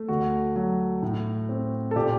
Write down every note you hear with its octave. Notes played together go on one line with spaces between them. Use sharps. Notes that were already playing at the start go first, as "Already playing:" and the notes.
Already playing: A3
D2 F#4
F#3
A2
C4
A4
A#2 G4